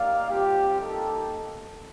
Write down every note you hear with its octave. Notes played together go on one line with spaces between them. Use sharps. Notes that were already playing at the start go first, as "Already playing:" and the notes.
Already playing: A#3 D#4 G4 D5 F5
G3 C4 F4 G4
A#3 D#4 G4 A4